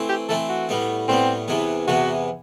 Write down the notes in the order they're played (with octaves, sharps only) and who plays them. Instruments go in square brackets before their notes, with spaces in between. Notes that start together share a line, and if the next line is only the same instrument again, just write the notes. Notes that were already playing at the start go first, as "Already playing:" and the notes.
Already playing: [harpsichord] E3 A3 C4
[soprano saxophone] G4
[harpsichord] E3 A3 C4 [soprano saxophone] A4
[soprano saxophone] F#4
[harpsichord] A2 G3 B3
[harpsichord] A2 G3 B3 [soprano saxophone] C4
[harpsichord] E2 C3 E3 B3
[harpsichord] E2 C3 E3 B3 [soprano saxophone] F#4